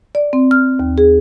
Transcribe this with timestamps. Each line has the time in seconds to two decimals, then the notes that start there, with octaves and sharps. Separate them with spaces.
0.15 D5
0.33 C4
0.51 F6
0.79 D#2
0.98 G#4